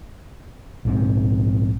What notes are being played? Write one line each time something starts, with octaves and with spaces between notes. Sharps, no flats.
A#1 G#2 C3